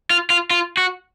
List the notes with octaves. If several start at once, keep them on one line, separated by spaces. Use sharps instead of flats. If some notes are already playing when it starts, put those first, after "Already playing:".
F4
F4
F4
F#4